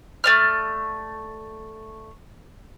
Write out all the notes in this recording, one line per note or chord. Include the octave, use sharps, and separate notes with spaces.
A3 D5 F6